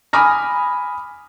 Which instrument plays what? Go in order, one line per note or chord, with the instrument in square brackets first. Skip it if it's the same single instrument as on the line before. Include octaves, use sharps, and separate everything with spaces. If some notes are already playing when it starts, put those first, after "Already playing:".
[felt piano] G#5 B5 D6 D#6 F6 A#6